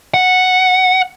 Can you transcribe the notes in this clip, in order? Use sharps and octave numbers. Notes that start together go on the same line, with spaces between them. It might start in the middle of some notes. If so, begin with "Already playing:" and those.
F#5